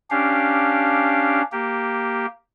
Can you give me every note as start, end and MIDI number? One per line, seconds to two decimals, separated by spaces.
0.10 1.42 61
0.10 1.42 62
0.10 1.42 67
0.10 1.42 77
1.52 2.26 58
1.52 2.26 67